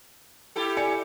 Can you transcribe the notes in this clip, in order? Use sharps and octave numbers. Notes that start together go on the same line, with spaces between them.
E4 G4 A4
D5 G#5 C#7